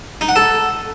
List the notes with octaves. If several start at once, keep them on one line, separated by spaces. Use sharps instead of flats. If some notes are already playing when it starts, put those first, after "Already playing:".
D#4
F#5
A4